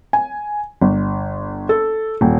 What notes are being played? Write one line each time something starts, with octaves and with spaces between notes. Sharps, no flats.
G#5
G1
A4
D#1